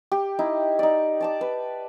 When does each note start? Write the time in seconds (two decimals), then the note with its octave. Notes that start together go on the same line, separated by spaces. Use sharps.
0.12 G4
0.39 D#4 E4
0.79 D#4 D5
1.21 D5 A5 D6
1.41 B4